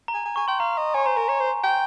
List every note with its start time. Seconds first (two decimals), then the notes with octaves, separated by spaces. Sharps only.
0.08 A#5
0.14 G#5
0.25 G#5
0.36 G#5 C#6
0.48 G5 C6
0.60 F5 A#5
0.77 D#5
0.94 C#5 G#5
1.06 C5 A#5
1.17 A#4 A#5
1.29 C#5 A#5
1.40 C5
1.63 G5